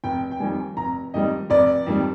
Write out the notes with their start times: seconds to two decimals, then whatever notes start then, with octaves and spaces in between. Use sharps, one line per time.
0.04 F1 G5
0.31 G5
0.40 F2 D#3 G3 G#5
0.77 F1 A#5
1.14 F2 D#3 G3 D#5
1.50 F1 D5
1.86 F2 D#3 G3